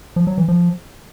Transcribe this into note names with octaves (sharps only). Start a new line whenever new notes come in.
F3
F#3
E3
F3